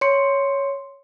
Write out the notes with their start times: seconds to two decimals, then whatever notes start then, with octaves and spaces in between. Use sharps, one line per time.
0.01 C#5 C6 C#7